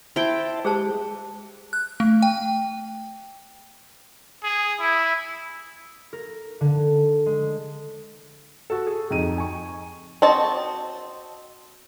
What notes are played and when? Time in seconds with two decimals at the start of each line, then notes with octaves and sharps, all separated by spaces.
0.16 E4 C5 E5 G5 A5
0.65 G#3 G4 G#4 C5 A5
1.73 F#6
2.00 A3
2.22 G5
4.43 G#4
4.80 E4
6.13 A#4
6.61 D3
7.26 G#3
8.70 F#4 A4
8.87 G#4
9.10 F2 D#4 D#7
9.38 G#5 C#6
10.22 C4 F#4 D#5 A5